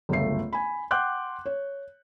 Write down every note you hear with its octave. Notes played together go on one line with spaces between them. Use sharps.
G1 C#2 F#2 A3 C7
G#5 B5
F#5 G5 C6 D6 F#6 G6
C#5